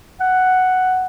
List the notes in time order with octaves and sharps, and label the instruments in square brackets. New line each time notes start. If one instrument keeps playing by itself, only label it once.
[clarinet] F#5